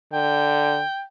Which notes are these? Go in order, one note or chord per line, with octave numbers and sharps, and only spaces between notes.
D3 G5